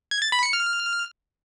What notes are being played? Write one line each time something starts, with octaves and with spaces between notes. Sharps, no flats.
G#6
A6
B5
C#7
F6